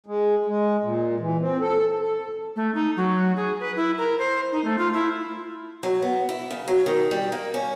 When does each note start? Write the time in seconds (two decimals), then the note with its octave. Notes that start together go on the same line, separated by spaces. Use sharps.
0.06 G#3
0.46 G#3
0.83 A#2
1.20 E3
1.40 C4
1.60 A4
2.00 A4
2.56 A3
2.74 D#4
2.97 F#3
3.36 G#4
3.60 B4
3.76 E4
3.98 A#4
4.19 C5
4.52 D#4
4.64 A3
4.78 F4
4.93 E4
5.83 F#3
6.02 B3
6.29 E4
6.51 C#3
6.68 F#3
6.86 D#3
7.11 G3
7.32 A#3
7.54 C#4